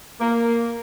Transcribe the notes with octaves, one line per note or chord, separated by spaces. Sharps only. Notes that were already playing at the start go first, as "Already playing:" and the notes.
A#3